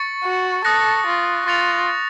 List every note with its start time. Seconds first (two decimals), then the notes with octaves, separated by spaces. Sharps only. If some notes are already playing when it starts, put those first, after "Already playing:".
Already playing: C#6 A6 C#7
0.24 F#4
0.65 A4 D#6 F#6 A#6 C#7
1.06 F4
1.46 F4 C#6 A6 C#7 F7